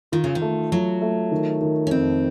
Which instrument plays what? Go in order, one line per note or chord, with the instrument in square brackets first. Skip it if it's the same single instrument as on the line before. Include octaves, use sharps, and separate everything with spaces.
[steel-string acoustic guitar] D#3 [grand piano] F4
[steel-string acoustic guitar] C#3
D#3
[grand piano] A3
[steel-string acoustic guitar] F#3 [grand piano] F4
[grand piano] A3
D#3
D#3
[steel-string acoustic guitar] C#4
[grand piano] F2 [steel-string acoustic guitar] C4